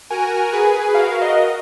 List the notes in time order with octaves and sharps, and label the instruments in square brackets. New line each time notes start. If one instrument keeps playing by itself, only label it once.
[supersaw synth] F#4 A#4 [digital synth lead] G#5
[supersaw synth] G#4 B4
[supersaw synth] F#4 A#4 [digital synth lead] F5
[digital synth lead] D#5